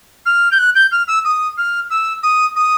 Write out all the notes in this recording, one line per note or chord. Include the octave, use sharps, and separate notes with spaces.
F6
G6
F#6
G6
F6
E6
D#6
F6
E6
D#6
D#6